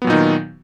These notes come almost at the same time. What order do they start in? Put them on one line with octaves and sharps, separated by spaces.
B3 F#3 A#2 D#4 D#3